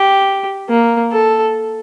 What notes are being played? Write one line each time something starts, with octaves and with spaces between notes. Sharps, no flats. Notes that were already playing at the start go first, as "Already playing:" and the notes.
Already playing: G4
A#3
A4